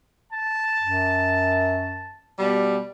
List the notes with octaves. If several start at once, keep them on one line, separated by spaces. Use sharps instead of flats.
A5
F#2
B2 G3